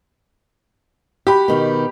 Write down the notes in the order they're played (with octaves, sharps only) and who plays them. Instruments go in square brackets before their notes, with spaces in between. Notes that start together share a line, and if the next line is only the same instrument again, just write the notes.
[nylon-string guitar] F#4 [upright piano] G4 B5
[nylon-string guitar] B2 D#3